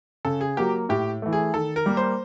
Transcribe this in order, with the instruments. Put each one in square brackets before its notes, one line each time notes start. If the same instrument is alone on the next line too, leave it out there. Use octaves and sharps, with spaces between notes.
[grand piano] C#3 [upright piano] A4
[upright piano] G#4
[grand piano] F#3 A#3 [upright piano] G4
[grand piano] A2 [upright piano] G4
[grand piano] E3 A3
[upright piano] G#4
[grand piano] D#3 [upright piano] A4
[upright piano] A#4
[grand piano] G3 A#3
[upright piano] C5